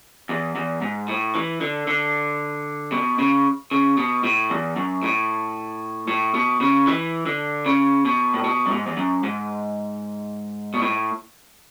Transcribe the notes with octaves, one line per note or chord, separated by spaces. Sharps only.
E2
E2
G#2
A2
E3
D3
D3
B2
C#3
C#3
B2
A2
E2
F#2
A2
A2
B2
C#3
E3
D3
C#3
B2
A2
B2
F#2
G#2
E2
F#2
G#2
B2
A2